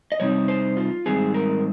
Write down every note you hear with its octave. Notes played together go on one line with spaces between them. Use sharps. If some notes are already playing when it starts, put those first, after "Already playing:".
D#5
F2 C3 G3 C4 D#4 C#5
C5
F4
G#2 D#3 G3 C4 G#4
A#4